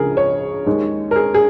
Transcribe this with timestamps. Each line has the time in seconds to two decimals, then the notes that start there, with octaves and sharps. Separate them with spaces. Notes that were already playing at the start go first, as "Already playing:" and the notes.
Already playing: C#2 C#3 F3 G#4 A#4
0.17 C#5
0.66 D#2 D#3 G#3
1.11 A#4
1.16 G#4
1.34 G#4